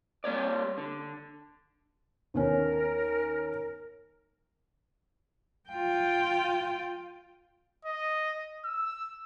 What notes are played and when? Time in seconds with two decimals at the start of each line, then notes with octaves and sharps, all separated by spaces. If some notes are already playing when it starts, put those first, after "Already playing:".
0.24 G3 A#3 C#5 D5
0.78 D3
2.34 D#2 B3 C#4 A#4
5.70 F4 G5
7.85 D#5
8.65 E6